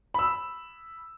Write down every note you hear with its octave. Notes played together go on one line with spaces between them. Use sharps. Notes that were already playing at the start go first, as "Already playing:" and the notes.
B5 E6